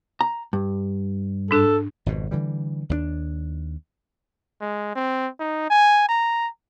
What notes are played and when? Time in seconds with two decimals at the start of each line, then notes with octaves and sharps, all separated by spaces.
0.21 A#5
0.53 G2
1.51 G#2 D4 A4 F#6
2.06 G#1 F2 B2
2.31 D3 E3 G3
2.89 D#2 A3 D4
4.61 G#3
4.95 C4
5.40 D#4
5.70 G#5
6.09 A#5